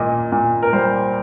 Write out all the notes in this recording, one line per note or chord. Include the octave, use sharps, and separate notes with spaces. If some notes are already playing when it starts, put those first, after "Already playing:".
Already playing: A#2 A#3 D#5
A#2
A#4
G3 C5